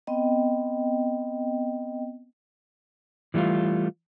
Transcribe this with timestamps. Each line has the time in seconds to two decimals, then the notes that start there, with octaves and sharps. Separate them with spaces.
0.07 B3 C4 D#5 G5
3.34 E3 G3 A3 D#4 F4